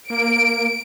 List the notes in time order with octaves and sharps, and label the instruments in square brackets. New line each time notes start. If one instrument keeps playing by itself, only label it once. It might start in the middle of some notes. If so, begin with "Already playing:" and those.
[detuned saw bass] A#3 [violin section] D7